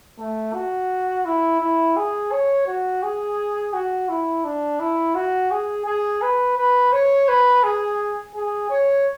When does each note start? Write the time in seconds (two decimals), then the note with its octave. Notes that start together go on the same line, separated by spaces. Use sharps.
0.19 A3
0.54 F#4
1.25 E4
1.60 E4
1.96 G#4
2.32 C#5
2.67 F#4
3.03 G#4
3.73 F#4
4.09 E4
4.44 D4
4.80 E4
5.15 F#4
5.51 G#4
5.86 G#4
6.22 B4
6.57 B4
6.92 C#5
7.28 B4
7.63 G#4
8.35 G#4
8.70 C#5